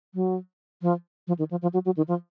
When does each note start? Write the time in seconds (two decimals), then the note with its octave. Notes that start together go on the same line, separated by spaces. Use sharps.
0.14 F#3
0.82 F3
1.27 F3
1.39 D#3
1.51 F3
1.62 F3
1.73 F#3
1.85 F#3
1.97 D#3
2.08 F3